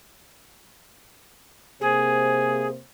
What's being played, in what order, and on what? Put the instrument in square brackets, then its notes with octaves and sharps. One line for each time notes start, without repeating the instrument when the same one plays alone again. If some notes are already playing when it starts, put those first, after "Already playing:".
[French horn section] C3 A#3 C5 [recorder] G#4